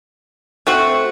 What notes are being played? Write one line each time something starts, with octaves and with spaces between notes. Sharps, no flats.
A3 C4 F#4